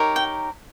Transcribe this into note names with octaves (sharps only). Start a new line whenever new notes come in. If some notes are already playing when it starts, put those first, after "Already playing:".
Already playing: D#4 G4 A#4 C#5
G5